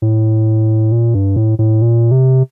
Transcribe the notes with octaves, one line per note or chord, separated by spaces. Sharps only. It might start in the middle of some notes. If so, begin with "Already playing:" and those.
A2
A#2
G2
A2
A2
A#2
C3